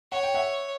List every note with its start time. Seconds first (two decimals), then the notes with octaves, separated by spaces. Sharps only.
0.12 C#5 F#5
0.23 G5
0.34 E5 F#5